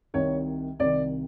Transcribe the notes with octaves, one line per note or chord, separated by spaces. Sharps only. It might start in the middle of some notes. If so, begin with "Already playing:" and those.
C2 C3 D#3 C#5
C2 C3 D#3 D5